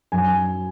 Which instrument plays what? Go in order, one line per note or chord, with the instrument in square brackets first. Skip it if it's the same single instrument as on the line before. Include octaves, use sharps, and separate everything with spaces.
[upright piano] F#2 G#5